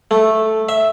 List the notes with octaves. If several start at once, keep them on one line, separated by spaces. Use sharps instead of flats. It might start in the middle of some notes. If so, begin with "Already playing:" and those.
A3
E5